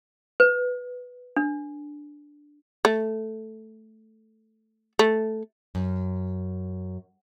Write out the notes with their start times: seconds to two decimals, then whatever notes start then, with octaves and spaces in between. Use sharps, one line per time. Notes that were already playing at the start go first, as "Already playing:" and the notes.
0.40 B4
1.36 D4
2.85 A3
4.99 A3
5.75 F#2